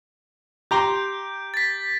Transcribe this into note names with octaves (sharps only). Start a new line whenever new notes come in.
G4 A#5 C6 G6 D7
A6 B6